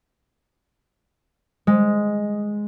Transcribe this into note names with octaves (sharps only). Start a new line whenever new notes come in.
G#3